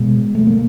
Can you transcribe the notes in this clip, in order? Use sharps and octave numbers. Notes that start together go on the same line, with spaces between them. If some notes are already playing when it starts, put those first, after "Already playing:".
Already playing: B2 G#3
A3
A#3